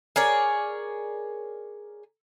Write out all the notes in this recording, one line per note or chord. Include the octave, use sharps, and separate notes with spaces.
G#4 A#4 C#5 D5